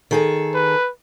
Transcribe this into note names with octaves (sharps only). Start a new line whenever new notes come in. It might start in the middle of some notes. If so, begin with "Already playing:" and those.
D#3 G#4 A4
B4